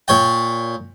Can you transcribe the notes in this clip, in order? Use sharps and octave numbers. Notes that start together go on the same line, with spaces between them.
A#2 C#5 G5